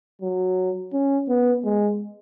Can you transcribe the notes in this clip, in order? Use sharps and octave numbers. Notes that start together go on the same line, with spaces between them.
F#3
C#4
B3
G#3